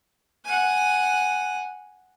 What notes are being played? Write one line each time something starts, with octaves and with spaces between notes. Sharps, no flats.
F#5 G#5